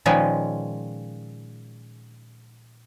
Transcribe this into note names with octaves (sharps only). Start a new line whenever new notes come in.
A#2 D#3 F3 G#3 C#4 B4